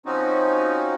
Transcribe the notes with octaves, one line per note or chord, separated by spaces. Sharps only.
F3 C4 C#4 D#4 F#4